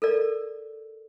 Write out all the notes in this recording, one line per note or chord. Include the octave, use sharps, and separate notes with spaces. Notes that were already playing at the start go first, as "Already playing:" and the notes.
A4 A#4 D5